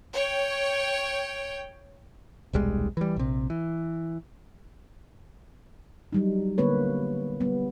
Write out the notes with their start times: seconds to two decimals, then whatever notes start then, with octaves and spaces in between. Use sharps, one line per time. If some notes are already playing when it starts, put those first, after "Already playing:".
0.13 C#5 G5
2.53 D#1 B1 G3 G#3
2.97 E3 G3
3.16 A#1 C3
3.50 E3
6.13 F#3 G3 D#4
6.58 D3 A#3 B3 B4 C#5
7.40 G3 B3